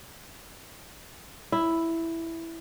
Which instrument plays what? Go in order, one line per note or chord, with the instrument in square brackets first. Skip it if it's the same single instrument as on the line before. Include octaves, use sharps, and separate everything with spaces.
[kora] E4